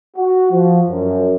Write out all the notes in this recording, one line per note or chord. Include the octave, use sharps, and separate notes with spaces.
F#4
F3
F#2